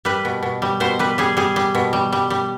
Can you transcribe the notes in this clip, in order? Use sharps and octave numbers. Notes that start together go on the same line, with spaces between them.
G3 B4
B2
B2
G3
B2 C5
G3 B4
G3 G#4
G3 G#4
G3
B2
G3
G3
G3